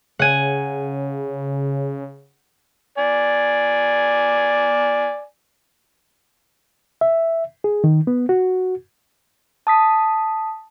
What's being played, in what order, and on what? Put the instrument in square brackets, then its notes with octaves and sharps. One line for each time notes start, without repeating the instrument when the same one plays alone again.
[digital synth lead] C#3 [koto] F#5 G#5
[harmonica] D5 G#5
[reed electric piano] E5
G#4
D#3
B3
F#4
[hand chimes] A5 D#6 B6